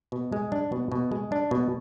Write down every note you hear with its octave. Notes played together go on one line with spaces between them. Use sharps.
B2
G#3
D4
B2
B2
G#3
D4
B2